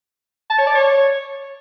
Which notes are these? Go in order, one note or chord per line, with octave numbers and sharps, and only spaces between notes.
A5
C#5
D5
C#5